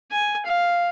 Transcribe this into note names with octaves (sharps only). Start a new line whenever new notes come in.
G#5
F5